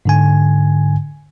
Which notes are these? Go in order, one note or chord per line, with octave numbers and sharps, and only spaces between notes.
G#2 D3 G#5